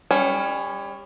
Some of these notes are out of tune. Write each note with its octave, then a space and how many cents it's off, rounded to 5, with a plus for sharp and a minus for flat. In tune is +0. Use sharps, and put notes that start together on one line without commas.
G3 +30 C#4 +0